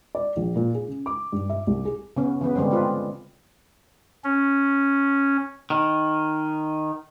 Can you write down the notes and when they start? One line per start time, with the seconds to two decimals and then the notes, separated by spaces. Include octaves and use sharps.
0.15 D5
0.37 A#1
0.56 A#2
0.75 G#4
0.88 C#3
1.06 D6
1.32 G2
1.50 E5
1.67 C2
1.85 G#4
2.17 C#3 B3 C#4
2.41 C#3 E3 B3 B4
2.55 D3 G3 G#3 C4 C#4
2.71 G#3 C4 F4 B4
4.24 C#4
5.70 D#3